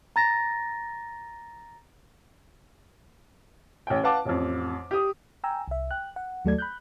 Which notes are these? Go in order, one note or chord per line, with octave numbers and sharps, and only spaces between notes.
A#5 A6 A#6
A1 G5
B4 F5 F#5 A5 D6
A1 F2
G4 D#6
G5 G#5 A#5 E6
C2 E5
G5 F#6
F#5
D#2 F#3 A3 A4 D5 G#6
B5 F#6 G6